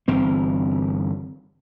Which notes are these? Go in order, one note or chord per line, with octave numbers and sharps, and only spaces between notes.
G1 E3 C4